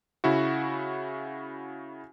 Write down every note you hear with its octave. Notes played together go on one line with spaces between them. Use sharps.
C#3 E4 F#4